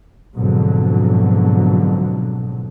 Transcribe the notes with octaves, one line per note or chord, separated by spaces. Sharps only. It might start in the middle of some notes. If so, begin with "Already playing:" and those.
F2 G#2 B2 D3 F#3